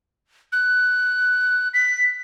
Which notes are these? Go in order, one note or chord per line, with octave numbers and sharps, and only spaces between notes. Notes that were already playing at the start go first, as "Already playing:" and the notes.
F#6
B6